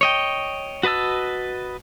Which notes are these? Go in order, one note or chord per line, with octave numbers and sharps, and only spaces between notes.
C#5 D#5 G5
F#4 B4 D#5 A5 E6